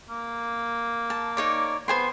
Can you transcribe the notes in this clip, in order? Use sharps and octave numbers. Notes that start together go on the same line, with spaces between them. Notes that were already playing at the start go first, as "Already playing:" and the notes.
A#3
A5
D#4 C#5 D5
B3 C5 G#5 C6